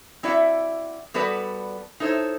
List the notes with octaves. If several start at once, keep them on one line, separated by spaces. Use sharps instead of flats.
C4 E4 F#4 D5 E5 F#5
G3 B3 F#4 A4 B4 D5
D#4 E4 A4 C5 C#5